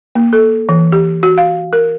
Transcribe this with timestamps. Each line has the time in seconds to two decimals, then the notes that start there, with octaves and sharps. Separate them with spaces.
0.15 A#3
0.33 A4
0.69 E3
0.92 G4
1.23 F#4
1.38 F5
1.73 A#4